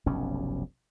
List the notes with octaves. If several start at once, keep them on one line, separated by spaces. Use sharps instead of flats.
F1 B1 G2 C#4